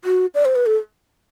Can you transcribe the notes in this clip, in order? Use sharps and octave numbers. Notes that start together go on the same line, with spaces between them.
F#4
D5
C5
B4
A4